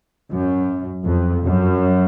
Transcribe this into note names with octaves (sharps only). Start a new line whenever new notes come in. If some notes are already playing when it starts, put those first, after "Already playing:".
F#2
F2
F#2